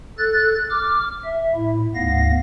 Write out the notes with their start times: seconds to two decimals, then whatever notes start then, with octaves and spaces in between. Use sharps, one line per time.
0.18 A4 F#6 A6
0.70 D6 F6
1.24 E5
1.55 A2 E4
1.95 D2 G#2 B3 F5 A#6